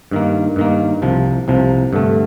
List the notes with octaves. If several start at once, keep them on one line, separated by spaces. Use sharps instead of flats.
G2 D#3 A#3
G2 D#3 A#3
C2 C3 F3
C2 C3 F3
G2 D3 A3